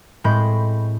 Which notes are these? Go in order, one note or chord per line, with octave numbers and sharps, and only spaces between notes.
A2 G#3 C4 B5 G6 A#6